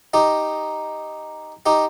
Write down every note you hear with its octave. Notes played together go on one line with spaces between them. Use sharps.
D#4 G4
D#4 G4